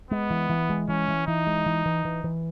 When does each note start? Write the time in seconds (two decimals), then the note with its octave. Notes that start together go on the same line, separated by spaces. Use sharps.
0.11 G#3 B3
0.30 E3
0.50 E3
0.69 G#3
0.88 E3 C#4
1.08 E3
1.27 E3 D#4
1.47 G#3
1.66 E3
1.86 E3
2.05 E3
2.24 E3